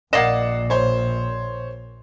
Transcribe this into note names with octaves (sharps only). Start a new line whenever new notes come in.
A#1 A#2 A#3 D5 D#5 F#5 C7 E7
C5 C#5